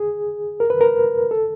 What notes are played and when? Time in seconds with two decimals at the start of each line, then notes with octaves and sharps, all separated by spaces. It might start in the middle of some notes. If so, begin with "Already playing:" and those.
Already playing: G#4
0.60 A#4
0.70 B4
0.81 A#4
1.31 A4